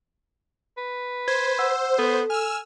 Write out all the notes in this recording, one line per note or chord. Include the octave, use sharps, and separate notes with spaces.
B4
C5 G#6
F#5 E6
B3 A4
G#5 E6 F6